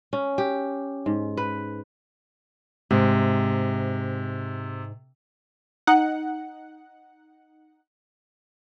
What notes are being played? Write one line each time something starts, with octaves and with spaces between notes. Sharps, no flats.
C#4
G4
G#2
B4
G#2 C3
D#4 F#5